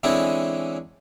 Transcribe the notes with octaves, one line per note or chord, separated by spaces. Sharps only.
D3 E3 G#3 C4 C#4 E4